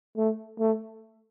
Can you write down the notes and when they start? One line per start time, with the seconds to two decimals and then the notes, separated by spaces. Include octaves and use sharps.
0.17 A3
0.60 A3